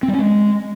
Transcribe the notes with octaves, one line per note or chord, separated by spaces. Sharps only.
C4
G3
C#4
G#3